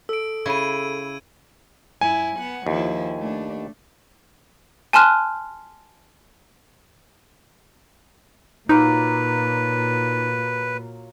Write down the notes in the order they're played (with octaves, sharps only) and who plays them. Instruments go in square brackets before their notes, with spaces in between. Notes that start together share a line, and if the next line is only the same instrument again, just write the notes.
[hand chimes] A4 [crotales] E6 D7
[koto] C#3 E4 [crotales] G#6 D#7
[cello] F#2 E4 [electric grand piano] G#5
[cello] B3 F#5
[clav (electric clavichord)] D#2 [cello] F3 E4
[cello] A3 D4
[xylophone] G#5 A5 C6 F6 F#6
[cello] A#2 [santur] F#3 F4 D6 [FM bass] D#4 [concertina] B4